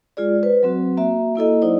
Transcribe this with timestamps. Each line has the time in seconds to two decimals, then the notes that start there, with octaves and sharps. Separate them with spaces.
0.17 G#3 F4 G#4 D5
0.43 B4 C5
0.63 F#3 C4 F#4
0.97 A#3 F#4 E5
1.35 A#3 E4 A4 D#5
1.62 F#3 D#4 E4 C5 D5